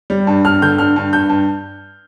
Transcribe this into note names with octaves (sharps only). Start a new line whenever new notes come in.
G3
G2
G2 F6
D3 G6
G2 F6
G2
G2 G6
G2